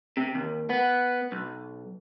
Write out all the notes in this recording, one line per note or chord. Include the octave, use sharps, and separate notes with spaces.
C3
D#2
B3
B1